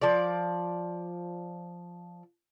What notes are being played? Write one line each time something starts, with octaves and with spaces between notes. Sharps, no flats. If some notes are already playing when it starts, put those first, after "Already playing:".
F3 D5